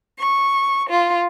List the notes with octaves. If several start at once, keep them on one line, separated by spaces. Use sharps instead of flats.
C#6
F4